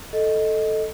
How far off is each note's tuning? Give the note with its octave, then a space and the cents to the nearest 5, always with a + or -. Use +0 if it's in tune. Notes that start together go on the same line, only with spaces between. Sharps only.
A4 +0 D#5 +0